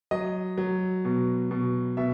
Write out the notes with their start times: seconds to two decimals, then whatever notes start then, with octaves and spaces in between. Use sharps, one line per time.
0.11 F#3 D#5
0.58 F#3
1.05 B2
1.51 B2
1.97 B2 E5